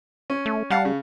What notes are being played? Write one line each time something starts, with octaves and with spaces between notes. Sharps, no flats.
C#4
A3
G3 F5 F#5 A5
C#3